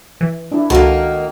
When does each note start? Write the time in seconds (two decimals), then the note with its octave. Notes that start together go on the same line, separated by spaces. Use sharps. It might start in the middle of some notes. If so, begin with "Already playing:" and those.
0.21 E3
0.52 D4 E4
0.70 C#2 D#3 A#3 F#4 A4 A5 D#7